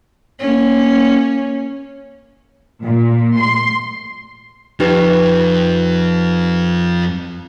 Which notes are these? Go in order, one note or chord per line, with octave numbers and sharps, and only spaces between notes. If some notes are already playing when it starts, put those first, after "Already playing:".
A#3 C#4
A#2
C6
F2 F3 D#4 G4 B4